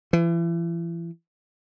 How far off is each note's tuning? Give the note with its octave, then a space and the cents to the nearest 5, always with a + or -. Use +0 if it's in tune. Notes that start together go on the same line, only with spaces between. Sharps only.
E3 +35